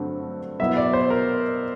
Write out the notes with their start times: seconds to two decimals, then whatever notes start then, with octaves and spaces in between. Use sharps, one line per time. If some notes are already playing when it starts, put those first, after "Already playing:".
Already playing: G2 D3 F#3 A3 C4
0.59 B2 F#3 B3 E4 E5
0.77 D5
0.93 C5
1.10 A#4